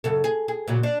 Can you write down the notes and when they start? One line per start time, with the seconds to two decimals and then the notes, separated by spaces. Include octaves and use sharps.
0.04 F#2 C#3 A4
0.24 G#4
0.48 G#4
0.68 A#2 C#3 F#3
0.83 D4